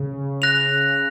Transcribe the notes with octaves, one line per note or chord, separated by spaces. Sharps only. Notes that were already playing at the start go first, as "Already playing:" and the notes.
Already playing: C#3
F#6 A#6 F7